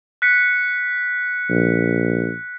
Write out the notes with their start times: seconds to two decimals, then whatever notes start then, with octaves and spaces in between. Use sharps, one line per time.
0.22 F#6 B6 C#7
1.49 A#1